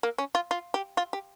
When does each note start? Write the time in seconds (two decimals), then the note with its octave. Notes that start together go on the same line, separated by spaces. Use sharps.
0.03 A#3
0.18 C#4
0.35 F4
0.51 F4
0.74 G4
0.97 F4
1.13 G4